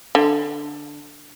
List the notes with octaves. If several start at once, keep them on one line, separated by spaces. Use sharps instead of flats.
D3